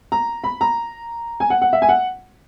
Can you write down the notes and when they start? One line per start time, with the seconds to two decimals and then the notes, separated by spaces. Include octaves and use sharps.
0.12 A#5
0.44 B5
0.61 A#5
1.40 G#5
1.50 F#5
1.62 F#5
1.73 E5
1.82 G#5
1.89 F#5